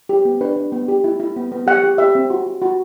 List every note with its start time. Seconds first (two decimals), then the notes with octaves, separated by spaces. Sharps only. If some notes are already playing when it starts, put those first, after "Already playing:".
0.09 G4
0.25 B3
0.41 D4 B4
0.57 D4
0.72 B3
0.88 G4
1.04 E4
1.20 E4
1.36 B3
1.52 B3
1.67 G4 F#5
1.84 G4
1.98 G4 E5
2.15 C4
2.30 F#4
2.46 F#4
2.62 F#4